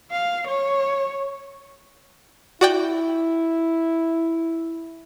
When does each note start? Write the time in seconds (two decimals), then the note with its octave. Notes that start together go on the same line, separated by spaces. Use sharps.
0.11 F5
0.47 C#5
2.61 E4 F#4 D5 G5